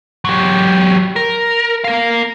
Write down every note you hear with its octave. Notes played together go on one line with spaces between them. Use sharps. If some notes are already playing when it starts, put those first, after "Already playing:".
F#3 G4
A#4
A#4 F5